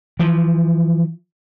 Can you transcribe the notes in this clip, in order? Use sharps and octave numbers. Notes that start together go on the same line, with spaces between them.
E3 F3